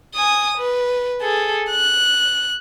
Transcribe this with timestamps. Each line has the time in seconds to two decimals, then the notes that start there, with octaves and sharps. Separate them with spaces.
0.14 G#5 D#6
0.58 B4
1.21 G#4 A4
1.71 F#6